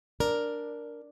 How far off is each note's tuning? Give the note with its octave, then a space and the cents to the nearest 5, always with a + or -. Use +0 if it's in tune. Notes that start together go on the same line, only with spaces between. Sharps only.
D4 +0 A#4 +0 D5 +0